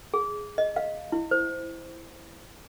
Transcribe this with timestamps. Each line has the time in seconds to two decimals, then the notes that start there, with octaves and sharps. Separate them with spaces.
0.14 G#4
0.58 D#5
0.76 F5
1.12 E4
1.31 C5